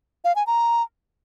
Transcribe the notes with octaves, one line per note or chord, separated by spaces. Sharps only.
F5
G#5
A#5